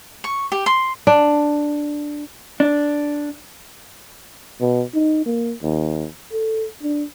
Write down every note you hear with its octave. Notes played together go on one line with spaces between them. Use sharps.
C#6
G4
C6
D4
D4
B2
D#4
A#3
D#2
A4
D4